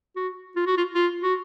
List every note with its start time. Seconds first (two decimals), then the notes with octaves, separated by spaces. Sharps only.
0.16 F#4
0.56 F4
0.66 F#4
0.77 F4
0.95 F4
1.23 F#4